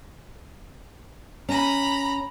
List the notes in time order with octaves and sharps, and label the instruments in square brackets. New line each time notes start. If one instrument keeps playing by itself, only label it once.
[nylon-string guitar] C#4 [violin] A#5 B5